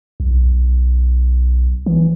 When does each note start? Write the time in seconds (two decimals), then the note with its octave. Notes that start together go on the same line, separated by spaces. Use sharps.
0.20 B1
1.86 E3